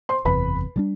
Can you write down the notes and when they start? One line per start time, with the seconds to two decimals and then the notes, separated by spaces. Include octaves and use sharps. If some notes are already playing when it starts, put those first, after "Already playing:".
0.09 C5 C6
0.25 F#1 E2 C3 B4 B5
0.76 D3 G3 D4